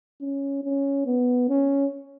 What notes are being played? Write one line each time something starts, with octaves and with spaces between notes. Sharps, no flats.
C#4
C#4
B3
C#4